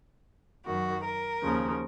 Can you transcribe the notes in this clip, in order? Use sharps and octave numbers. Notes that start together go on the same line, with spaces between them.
F#2 D#3 F#4
A#4
D#2 C#3 F3